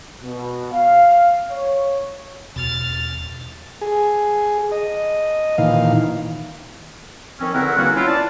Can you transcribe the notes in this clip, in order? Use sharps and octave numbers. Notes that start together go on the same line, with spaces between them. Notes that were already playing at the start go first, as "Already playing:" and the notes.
B2
F5
C#5
E2 B2 F6 A6
G#4
D#5
A#2 D#3 E3 F5
D#3 F3 C4 C#4
E2 D3 C4 E4 A#4 F#5
E3 G3 A#3 C#4 F4 F#4
C#4 E4 F4
D5 A5